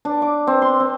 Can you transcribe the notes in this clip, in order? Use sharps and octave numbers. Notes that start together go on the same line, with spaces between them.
D4
D6
C4
C6
C4